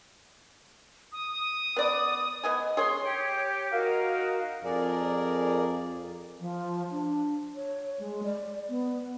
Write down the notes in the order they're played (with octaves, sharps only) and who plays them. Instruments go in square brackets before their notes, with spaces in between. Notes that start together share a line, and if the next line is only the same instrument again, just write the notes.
[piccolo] D#6
[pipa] B3 D5
B3 D#5 G#5
[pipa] G#4 C#5 [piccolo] C6
[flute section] G4 C#5 G5
D#4 F#4 A#4 F5
[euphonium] F2 [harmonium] G#4 A#4 D5
[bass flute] F3
D4
C#5
G#3
D5
B3